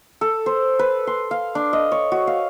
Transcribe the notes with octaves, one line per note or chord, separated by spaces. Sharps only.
A4
C5
B4
C6
F5
D4
D#5
C#5
F#4
F5